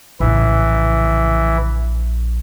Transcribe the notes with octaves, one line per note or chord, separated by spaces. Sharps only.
A#1 A2 C#3 E3 E4